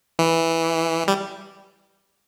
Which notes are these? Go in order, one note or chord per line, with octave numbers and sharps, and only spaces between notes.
E3
G3